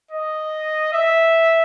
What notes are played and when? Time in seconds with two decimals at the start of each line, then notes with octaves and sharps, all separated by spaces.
0.11 D#5
0.93 E5